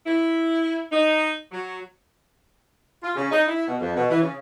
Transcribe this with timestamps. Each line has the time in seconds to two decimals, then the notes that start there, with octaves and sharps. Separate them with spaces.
0.06 E4
0.92 D#4
1.52 F#3
3.03 F4
3.16 C#3
3.32 D#4
3.48 E4
3.67 B2
3.81 F2
3.96 B2
4.10 E3
4.22 C#3